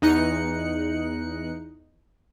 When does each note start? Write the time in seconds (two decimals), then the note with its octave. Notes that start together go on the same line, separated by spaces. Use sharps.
0.02 E2 D#4 F#6 C#7